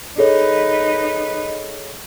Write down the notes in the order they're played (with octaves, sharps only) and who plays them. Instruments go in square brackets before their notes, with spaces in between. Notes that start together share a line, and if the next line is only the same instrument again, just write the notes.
[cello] D#4 B4 [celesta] G#4 A4 C#5